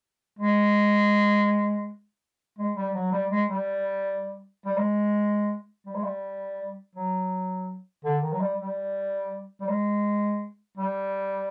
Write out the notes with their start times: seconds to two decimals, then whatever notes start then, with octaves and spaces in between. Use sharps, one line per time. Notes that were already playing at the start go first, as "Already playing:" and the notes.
0.39 G#3
2.58 G#3
2.76 G3
2.95 F#3
3.12 G3
3.31 G#3
3.49 G3
4.66 G3
4.77 G#3
5.86 G3
5.95 G#3
6.04 G3
6.95 F#3
8.04 D3
8.23 D#3
8.32 F#3
8.41 G3
8.59 G3
9.61 G3
9.69 G#3
10.77 G3